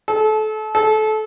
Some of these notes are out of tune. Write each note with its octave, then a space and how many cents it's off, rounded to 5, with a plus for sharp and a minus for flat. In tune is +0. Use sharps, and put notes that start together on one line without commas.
A4 -30
A4 -25